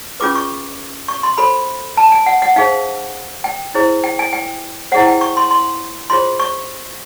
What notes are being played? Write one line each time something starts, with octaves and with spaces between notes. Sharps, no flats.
C#4 F4 G#4 B4 D6
C#6
C#6
C6
F#4 A4 C5 B5
A5
G#5
F#5
F#5
D#4 G#4 C5 F5
G5
E4 G#4 C5
G5
G#5
G5
E4 G#4 C5 F#5
G5
C#6
C6
C6
F4 G#4 C5 C6
C#6